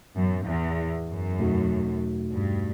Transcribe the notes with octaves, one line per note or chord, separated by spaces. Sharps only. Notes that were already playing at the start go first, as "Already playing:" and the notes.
F#2 A2 E3 B3
E2
F#2
E2 B2 A3 D#4 F#4
G2